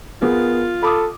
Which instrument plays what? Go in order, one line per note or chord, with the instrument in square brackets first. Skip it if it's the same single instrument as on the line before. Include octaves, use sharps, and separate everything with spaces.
[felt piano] B3 G#4 A#4 [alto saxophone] F4
[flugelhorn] A4 [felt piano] B5 D6 D#6